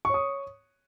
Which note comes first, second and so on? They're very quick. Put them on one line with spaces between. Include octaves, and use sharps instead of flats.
C#6 C#5 D#6